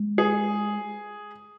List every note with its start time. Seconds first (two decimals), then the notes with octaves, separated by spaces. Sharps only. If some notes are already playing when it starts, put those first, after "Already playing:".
Already playing: G#3
0.18 G#4